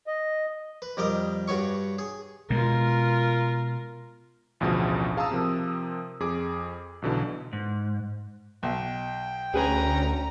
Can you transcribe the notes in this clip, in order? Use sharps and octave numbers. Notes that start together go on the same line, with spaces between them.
D#5
B4
F2 G3 A#4 D#5
G2 F#4 C#5 C#6
G#4
B2 G#3 F4 A#4
A1 D2 B2 F3 G#4 D#6
G#4 F5 A5 A#5 D#6 E6
C3 F3 A#4
F2 G#4 D6
B1 B2 D3 E3
G#2
B1 G5
D2 C#4 G#4 B4 G#5 A#5